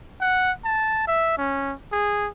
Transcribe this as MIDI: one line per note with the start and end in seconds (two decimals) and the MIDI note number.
0.21 0.51 78
0.64 1.05 81
1.07 1.34 76
1.38 1.74 61
1.92 2.28 68